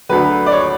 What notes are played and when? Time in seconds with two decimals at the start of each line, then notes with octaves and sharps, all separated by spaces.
0.09 D2 D3 F#3 B4
0.46 D5
0.52 C#5